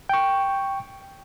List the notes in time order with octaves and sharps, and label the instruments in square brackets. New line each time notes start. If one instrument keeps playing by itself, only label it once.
[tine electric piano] G5 C#6